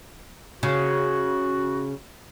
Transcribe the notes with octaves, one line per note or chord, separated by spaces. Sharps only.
C#3 F#4